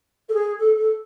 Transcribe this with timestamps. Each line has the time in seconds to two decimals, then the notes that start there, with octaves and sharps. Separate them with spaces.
0.28 A4
0.33 G#4
0.59 A4
0.77 A4